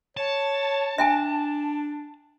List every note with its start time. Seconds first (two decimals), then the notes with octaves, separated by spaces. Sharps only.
0.17 C#5 A5
0.98 D4 E5 G5 G#5